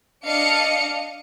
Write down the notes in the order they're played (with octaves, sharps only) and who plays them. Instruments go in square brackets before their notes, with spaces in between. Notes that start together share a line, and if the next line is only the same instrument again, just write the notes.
[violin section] D4 D#5 F5 C#7